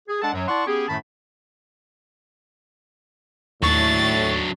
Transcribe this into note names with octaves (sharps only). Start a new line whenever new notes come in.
G#4
G#3 D4 A4 F#5 A5
F#2 F#3
E4 D5 F#5 A5 C6 C#6
B3 C#4 G4 G#4
F#2 A2 D#3 A3 A5 B5
D#2 A2 F#3 D4 C#6 A6